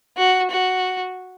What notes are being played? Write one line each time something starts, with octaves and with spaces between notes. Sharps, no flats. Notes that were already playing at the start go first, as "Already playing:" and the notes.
F#4
F#4